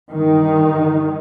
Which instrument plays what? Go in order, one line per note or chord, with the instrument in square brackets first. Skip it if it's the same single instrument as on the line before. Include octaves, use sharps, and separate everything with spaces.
[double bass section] G2 D#3